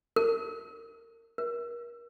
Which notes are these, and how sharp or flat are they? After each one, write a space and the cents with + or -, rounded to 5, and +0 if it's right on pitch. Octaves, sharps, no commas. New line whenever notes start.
A#4 -30
A#4 +30